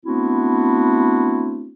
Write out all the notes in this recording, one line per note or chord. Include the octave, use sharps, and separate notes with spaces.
A3 B3 C4 D4 E4 F#4